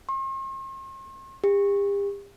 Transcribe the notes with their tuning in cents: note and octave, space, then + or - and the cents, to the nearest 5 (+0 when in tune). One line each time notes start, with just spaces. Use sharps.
C6 +45
G4 +40